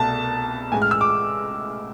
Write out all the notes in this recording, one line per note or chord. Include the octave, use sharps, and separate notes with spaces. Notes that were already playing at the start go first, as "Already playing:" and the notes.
Already playing: C2 B2 A3 A5
A1 A2 G#3 G#5
F6
E6
D6